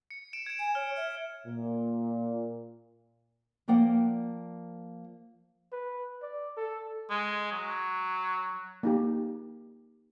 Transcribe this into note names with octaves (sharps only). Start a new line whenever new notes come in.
C#7
D7 E7
G#6 E7
G#5
C#5 F6
E5
A#2
F3 A#3 D5 F#5 G5
B4
D5
A4
G#3
F#3
A#3 D#4 G4